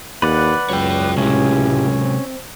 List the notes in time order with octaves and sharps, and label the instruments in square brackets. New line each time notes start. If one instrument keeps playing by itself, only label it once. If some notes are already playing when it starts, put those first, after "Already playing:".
[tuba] D#2 [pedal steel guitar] B4 D5 F#5
[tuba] C#2 [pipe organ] F#2 F#3 [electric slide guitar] C#5 G5
[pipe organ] A2 E4 G4 [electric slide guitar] C3 F#3 G#3 [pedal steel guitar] C#4
[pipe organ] C4